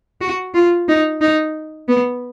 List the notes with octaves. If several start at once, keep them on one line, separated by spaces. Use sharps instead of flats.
F#4
F4
D#4
D#4
B3